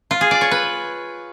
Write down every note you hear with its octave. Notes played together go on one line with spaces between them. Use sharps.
F4
G#4
D5
C#5
B4